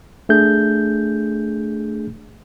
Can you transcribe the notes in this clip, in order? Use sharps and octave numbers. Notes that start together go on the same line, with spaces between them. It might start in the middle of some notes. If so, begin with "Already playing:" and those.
A3 D4 G#4 G6